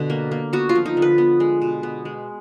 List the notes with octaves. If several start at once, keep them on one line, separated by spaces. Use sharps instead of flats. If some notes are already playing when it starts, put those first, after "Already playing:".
Already playing: B2 D3
A#3
A#3
B3 F#4
F4
F3
D#4
D3
B4
B3
G#3
B2
B3
G#3